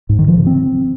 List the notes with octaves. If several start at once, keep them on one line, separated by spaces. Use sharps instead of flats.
G#2
D#3
F3
C#3
C4